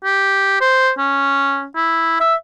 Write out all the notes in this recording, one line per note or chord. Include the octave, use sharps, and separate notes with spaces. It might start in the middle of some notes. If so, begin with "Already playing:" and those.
G4
C5
C#4
E4
E5